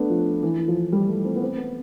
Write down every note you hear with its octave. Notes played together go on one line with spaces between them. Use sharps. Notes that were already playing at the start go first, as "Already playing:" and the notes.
Already playing: A3 B3 D4
F3
E3
E3
F3
G3
A3
C4
B3
C4
B3